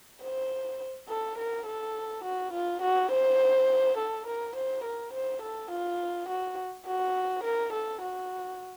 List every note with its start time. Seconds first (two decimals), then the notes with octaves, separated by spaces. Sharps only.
0.23 C5
1.09 A4
1.38 A#4
1.67 A4
2.24 F#4
2.53 F4
2.82 F#4
3.11 C5
3.97 A4
4.26 A#4
4.55 C5
4.84 A#4
5.13 C5
5.42 A4
5.71 F4
6.28 F#4
6.86 F#4
7.44 A#4
7.73 A4
8.01 F#4